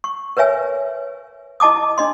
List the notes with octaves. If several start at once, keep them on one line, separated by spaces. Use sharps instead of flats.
C#6
A#4 B4 C#5 E5 G#5
E4 D#5 A5 D6 D#6
D4 D#5 C6